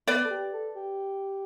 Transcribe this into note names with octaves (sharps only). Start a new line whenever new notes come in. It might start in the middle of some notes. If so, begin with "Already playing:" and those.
B3 B4 D5
A4
G4
A4
G4